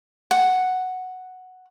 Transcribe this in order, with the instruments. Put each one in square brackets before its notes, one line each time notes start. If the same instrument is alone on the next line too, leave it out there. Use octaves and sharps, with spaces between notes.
[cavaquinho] F#5